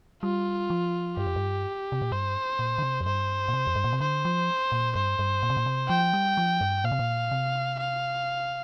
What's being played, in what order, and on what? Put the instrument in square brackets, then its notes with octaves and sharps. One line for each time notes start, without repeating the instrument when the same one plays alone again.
[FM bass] G3 [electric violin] F4
[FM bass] F3
[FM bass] G2 [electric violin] G4
[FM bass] F2
G2
C3
A#2
[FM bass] G2 [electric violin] C5
[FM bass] A#2
D3
C3
F2
[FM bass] G2 [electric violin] C5
[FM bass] A#2
C3
F2
G2
A#2
C3
[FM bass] D3 [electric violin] C5
[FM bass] F3
A#2
[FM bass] G2 [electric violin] C5
[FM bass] G2
A#2
C3
A#2
C3
[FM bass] F3 [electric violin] G5
[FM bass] G3
F3
G2
[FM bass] A#2 [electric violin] F5
[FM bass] C3
A#2
C3
[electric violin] F5